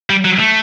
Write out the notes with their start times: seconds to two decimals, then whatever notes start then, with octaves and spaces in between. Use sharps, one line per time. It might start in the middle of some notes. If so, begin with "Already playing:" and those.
0.10 G3
0.25 F#3
0.40 A3